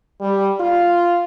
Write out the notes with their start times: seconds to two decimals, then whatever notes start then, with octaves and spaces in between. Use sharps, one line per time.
0.21 G3
0.60 F4